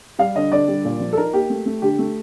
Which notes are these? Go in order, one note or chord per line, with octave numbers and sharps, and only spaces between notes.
G3 F5
D3 D#5
D3 D5
G3
A#2
F3
A4
D#4 A#4
A#3 G4
A3
A3
D3 G4
A3